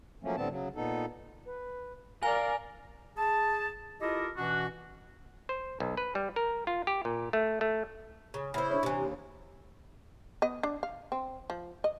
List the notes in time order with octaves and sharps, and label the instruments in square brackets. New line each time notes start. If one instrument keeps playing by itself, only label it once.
[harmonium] F3 F#3 A3 A#3 C#4
A2 D3 G3 B3 C4 A5
C#3 F#3
A#2 B3 D#4 A4
[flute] B4
[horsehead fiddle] A#4 D5 [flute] F5 [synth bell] G#5
[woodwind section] G#4 A5
E4 F4 G4 A4 A#4 D#5
B2 E3 C#4 D4 F#4
[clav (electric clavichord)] C5
B1
B4
G3
A#4
F4
G4
A#2
A3
A3
[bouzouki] C#3
[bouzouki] C#3 C5 [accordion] E4
[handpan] D4 C#5
[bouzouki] C3 E3
[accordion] D#2
[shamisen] B3 D#5
D4
F5
C4
F3
D#5